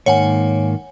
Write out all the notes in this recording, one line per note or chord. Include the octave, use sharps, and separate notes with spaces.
G#2 D#3 A#3 C#5 F#5 G#5